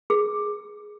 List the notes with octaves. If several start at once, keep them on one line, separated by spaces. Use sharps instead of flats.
G#4